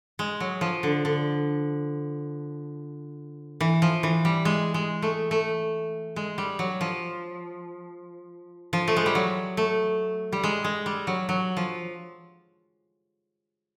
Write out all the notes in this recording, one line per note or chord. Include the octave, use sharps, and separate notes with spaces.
G#3
F#3
F3
D3
D3
E3
F3
E3
G3
G#3
G#3
A3
A3
G#3
G3
F#3
F3
F3
A3
G#3
G3
F#3
A3
G3
G#3
G#3
G3
F#3
F#3
F3